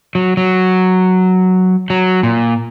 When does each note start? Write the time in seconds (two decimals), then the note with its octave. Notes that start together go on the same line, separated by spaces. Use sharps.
0.15 F#3
0.37 F#3
1.90 F#3
2.23 A#2